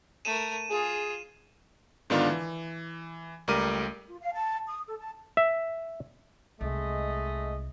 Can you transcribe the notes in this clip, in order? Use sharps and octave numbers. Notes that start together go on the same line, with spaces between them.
A3 A#4 D#7 E7
F4 G#4
G#2 D3 D#3 B3 D4 F4
E3
C#2 G3 A3 A#4 D6 D#7
F4
F5
A5
D#6
A4
A5
E5
C2 G#3 A3 D#5